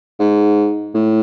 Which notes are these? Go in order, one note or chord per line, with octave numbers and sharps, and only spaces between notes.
G#2
A2